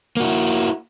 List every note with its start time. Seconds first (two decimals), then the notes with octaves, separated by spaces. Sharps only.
0.17 A#3
0.20 F#4
0.24 E4